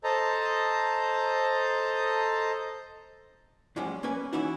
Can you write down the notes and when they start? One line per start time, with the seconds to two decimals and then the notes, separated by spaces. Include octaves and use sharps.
0.04 A4 C5 D#5 A5 A#5
3.76 F#2 A2 F3 G3 G#3 C#4
4.03 A#3 C#4 B4 G#5
4.33 E3 C#4 D#4 E4 F#4